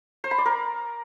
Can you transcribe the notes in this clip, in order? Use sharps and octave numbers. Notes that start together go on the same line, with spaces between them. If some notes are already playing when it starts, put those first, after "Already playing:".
C5
B5
D5
A#4